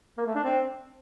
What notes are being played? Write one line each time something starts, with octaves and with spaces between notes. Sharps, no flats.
A#3
A3
D4
C4